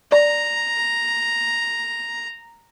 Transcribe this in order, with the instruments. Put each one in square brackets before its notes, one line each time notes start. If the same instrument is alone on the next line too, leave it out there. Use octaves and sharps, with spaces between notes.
[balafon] D5 [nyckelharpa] A#5